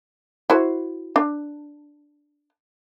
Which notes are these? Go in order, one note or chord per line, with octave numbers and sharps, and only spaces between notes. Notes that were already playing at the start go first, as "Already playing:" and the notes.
E4 F#4 C5
D4